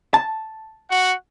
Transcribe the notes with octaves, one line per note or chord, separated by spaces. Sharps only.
A5
F#4 F#5